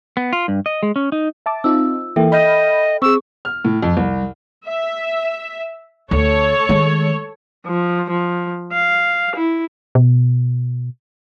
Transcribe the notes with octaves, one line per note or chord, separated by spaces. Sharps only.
B3
F4
G2
D#5
G#3
C#4
D#4
E5 A5 D6
C4 D#4 F4 E6
E3 A#3 A4 E5 G5
D#5 B5 F6 G6
C4 G#4 C#6 E6
F6
A2
F2
C2
E5
D2 A4 C#5
D#3 G#3
F3
F3
F5
E4
B2